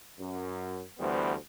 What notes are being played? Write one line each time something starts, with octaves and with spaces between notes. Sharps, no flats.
F#2
D2 E3 G3 B3 C5